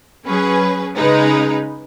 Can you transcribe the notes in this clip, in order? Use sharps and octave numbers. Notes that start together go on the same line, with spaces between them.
F#3 C#4 G#4 B4
C#3 G#3 D#4 B4